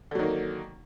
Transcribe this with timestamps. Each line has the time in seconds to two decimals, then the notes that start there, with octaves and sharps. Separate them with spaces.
0.11 D3
0.15 F#3
0.19 D#3
0.23 A#3